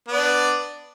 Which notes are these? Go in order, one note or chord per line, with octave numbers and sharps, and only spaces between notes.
B3 D4 D5